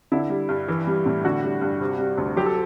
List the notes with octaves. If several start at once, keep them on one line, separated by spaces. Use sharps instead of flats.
D3 E4
G3
G2
E3
G3
A2
D3 F#4
G3
G2
C3
G3
D2
F#3 G4
A4